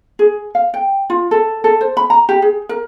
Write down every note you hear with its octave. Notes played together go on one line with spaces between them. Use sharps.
G#4
F5
G5
F4
A4
A4
C5
B5
A#5
G4
G#4
A#4